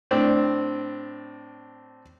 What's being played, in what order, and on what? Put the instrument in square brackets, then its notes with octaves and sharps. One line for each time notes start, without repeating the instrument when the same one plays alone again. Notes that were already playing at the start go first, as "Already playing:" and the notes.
[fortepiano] A2 C4 D4